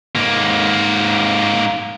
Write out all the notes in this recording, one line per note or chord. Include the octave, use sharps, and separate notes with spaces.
G#2 A#3